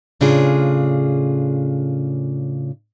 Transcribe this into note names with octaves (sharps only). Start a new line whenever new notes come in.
A2 C#3 D4 F4 G#4